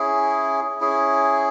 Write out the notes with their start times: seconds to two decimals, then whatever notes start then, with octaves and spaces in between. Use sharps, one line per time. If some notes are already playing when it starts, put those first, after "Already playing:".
Already playing: C#4 E4 G#4
0.81 C#4 E4 G#4